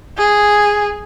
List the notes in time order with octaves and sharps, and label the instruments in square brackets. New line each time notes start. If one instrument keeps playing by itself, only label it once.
[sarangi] G#4